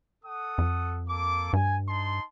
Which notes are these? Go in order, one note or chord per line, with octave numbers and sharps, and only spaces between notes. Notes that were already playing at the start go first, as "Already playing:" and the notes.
A4 F#5 D#6
F2
A#3 A4 D6
G2 G#5
D#4 A5 C6